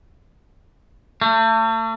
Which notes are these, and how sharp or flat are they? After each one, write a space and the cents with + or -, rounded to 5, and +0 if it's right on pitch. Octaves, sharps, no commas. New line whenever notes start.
A3 +35